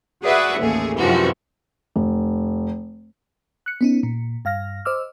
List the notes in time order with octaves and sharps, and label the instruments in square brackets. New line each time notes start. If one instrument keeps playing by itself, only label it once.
[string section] F#4 G#4 B4 D5 E5 F#5
A1 D#2 A3 G#4
F#2 C3 E3 F3 G3 F#4
[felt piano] F1
[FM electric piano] F#6 C#7
B3 C#4 D#4
A#2
G2 F5 F6 A#6
C5 D#5 D6 E6 F6